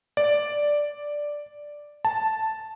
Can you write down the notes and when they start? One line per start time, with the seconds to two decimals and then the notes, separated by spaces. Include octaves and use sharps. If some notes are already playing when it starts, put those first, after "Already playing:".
0.17 D5
2.05 A5